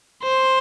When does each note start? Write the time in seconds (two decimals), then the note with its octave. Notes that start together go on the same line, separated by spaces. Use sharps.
0.23 C5